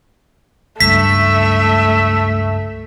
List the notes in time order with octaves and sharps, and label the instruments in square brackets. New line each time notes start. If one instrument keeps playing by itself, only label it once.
[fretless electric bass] C#2 G2 [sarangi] A3 [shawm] E5 [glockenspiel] B6